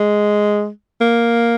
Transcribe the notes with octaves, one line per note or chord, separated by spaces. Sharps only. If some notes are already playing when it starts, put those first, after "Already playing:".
Already playing: G#3
A#3